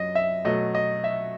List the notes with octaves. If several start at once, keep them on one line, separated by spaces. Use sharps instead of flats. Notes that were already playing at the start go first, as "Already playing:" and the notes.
Already playing: F#2 F#3 D#5
E5
B2 F#3 A3 D#5
D#5
E5